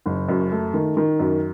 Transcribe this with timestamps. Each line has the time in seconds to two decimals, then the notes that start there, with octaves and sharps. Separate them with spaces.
0.06 F#1
0.29 F#2
0.52 A3
0.74 D#3
0.97 D#3
1.19 F#2